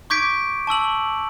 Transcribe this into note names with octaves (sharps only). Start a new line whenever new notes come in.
C#6 D6 G6 G#6 B6 D7
A5 C#6 E6 F#7